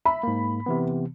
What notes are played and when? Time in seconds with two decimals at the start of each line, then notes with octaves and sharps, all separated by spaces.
0.06 E5 B5
0.23 G#2 A#3
0.66 C3 E3 B3